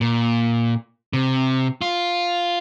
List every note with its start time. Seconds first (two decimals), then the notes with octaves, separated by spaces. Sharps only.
0.01 A#2
1.13 C3
1.81 F4